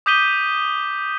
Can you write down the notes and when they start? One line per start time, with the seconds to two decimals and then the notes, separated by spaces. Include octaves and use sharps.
0.06 D6 D#6 G6 B6 D#7 G7